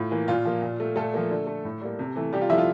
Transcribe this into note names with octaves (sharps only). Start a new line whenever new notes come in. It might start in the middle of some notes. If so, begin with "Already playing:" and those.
Already playing: A2 F4
E3 A#3
A#2 F4
F3 A#3
A#2
A3
A#2 A3 A4
F3 A#3
D3
A3
A2
G3 A#3
C3
E3 A3
C3 G3 G4
F4
F3 A3 E4 E5
F4